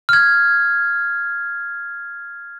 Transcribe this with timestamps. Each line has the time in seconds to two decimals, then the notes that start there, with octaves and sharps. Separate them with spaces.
0.09 F6 G#6